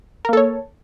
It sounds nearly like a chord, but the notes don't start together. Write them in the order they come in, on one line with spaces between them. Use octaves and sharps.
A#4 A#3 A4 C#5